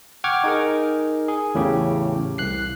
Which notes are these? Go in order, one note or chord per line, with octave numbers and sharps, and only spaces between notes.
F#5 G5 C#6 D6 F6 G#6
D#4 G#4 A#4
G#4
E2 A2 C#3 G4
C2 F#6 C7